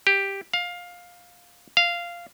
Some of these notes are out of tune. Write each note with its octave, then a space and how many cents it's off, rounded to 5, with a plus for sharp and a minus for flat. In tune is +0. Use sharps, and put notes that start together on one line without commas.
G4 +5
F5 +15
F5 -10